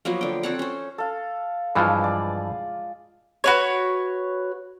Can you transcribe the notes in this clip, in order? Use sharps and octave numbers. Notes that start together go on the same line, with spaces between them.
F3 F#3 A#3 B3
D3 G5
C4 A4 C#5 F#5
C#4 C5
A4 F5
G2 E3 F3 G#3 F4
D5
F#4 B4 C#5